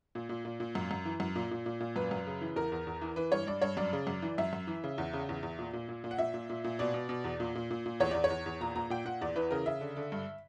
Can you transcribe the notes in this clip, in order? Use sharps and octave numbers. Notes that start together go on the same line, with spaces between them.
A#2
A#2
A#2
A#2
F#2
F#2
E3
F#2
A#2
A#2
A#2
A#2
F#2 B4
F#2
C#3
E3
E2 A#4
E2
E2
E3
E3 B4
G2 C#5
G2 D5
G2 C#5
F#2 D5
C#3
F#2
E3
F#2 E5
F#2
E3
C#3
E2
C#3
E2
E2
A#2
A#2
A#2
A#2
F#5
A#2 E5
A#2
A#2
A#2
B2 D5
B2
B2
E2
A#2
A#2
A#2
A#2
E2 C#5
E2 D5
C#5
E2
E2
A#2 A#5
A#2 A#5
A#2 G5
A#2 F#5
E2 D5
E3 B4
C#3 A#4
C#3 E5
D3
D3
G2